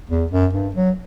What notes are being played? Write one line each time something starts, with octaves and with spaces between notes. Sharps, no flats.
E2
F#2
G2
F#3